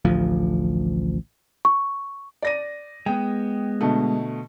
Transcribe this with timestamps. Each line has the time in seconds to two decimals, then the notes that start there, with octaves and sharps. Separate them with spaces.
0.05 A1 D2 F3
1.65 C#6
2.42 D5 A#6 D#7
3.06 G#3 B3 G5
3.81 B2 D3 A3